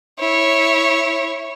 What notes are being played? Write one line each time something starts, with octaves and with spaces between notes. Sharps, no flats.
E4 C#5